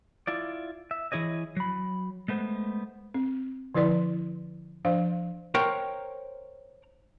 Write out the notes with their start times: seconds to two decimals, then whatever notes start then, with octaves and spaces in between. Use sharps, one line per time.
0.27 E4 F4 D5
0.91 E5
1.12 E3 E4 G#4 C#5 D#5
1.57 F#3 B5
2.28 G#3 A3 B3 C5
3.14 C4
3.75 D3 F3 E4 B4 D5 C6
4.85 F3 D4 C5 F5
5.54 A#4 C5 C#5 F#5 G5